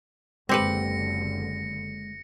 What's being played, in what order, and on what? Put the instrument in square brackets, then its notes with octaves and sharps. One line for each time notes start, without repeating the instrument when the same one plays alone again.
[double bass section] F#1 D3 [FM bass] G#3 [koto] C4 G4 B4 [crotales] A#6 C#7